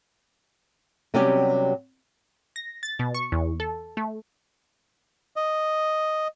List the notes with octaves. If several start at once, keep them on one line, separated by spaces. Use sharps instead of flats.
C3 F#3 G3 B3 C#4 G4
A#6
A6
B2
C#6
E2
A4
A3
D#5